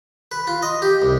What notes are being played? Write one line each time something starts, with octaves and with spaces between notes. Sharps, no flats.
B4
F4
D#5
G4
C2